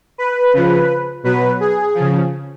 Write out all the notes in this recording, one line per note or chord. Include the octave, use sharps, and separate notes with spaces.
B4
C#3 F3
B2 F#3 B4
G#4
F3
C#3